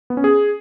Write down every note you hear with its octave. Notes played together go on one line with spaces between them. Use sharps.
B3
C#4
G#4